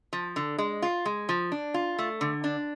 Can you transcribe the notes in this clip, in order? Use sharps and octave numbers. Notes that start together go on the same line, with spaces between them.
F3
D3
G#3
F4
G#3
F3
D4
F4
A3
D3
D4